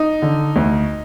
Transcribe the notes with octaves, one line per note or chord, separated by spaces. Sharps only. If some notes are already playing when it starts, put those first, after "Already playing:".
Already playing: D#4
D3
D2